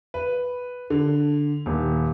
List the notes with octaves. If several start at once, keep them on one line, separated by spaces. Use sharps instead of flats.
B4
D3
D#1